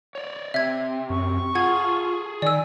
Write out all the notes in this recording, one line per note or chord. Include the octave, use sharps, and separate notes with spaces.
C#5 D5
C3 E5 G#6
F#2 C#6
F4 G#4 A4 F#5 G#6
D#3 D5 G#5 E6